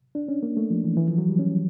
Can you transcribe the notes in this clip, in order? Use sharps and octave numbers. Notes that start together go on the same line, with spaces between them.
D4
C#4
A#3
A3
F3
E3
E3
F3
F#3
G3
C#4